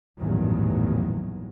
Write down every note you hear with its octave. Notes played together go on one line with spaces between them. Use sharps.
A1 E2 G2 A#2 D#3 F#3